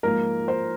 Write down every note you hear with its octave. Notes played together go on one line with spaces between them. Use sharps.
G#2 F3 A#3 A#4
C5